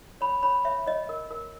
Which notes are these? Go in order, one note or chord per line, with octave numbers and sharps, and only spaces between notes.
C#5 B5
C#5 B5
C#5 E5
C#5 D#5
A#4
A#4